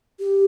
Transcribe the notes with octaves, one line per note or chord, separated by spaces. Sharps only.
G4